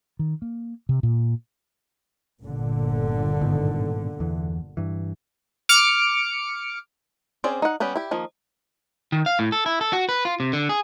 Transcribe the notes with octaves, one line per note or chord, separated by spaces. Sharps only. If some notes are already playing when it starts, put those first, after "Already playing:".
D#3
A#3
C3
A#2
G1 A#2 D3
G#2 B2 D#3
E2 E3
G2 E3
D6 F6 C#7 D7
C4 C#4 G#4 C5 D5
D#4 F#5
G3 B3 C#4 G4
E4 G4
D#3 F3 A#3
D#3
F5
A2
A4
E4
A4
F#4
B4
F4
C3
D3
G#4